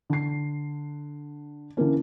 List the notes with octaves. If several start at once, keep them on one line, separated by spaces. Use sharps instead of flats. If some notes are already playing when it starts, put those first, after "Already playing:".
D3 C7
D3 E3 A#3 C#4